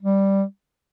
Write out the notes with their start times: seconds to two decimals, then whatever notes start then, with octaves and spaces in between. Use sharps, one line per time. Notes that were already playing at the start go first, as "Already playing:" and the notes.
0.02 G3